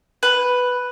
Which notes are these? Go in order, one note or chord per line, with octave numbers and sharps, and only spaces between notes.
B4